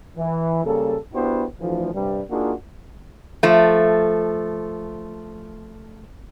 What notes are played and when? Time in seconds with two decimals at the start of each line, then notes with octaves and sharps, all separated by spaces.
0.17 E3
0.64 C#3 G3 A#3 A4
1.14 B3 D4 E4 F#4 G4 C5
1.60 D2 E3 F3
1.94 G2 C3 G3
2.30 A#3 D4 D#4 F4 F#4 G#4
3.43 F3 A3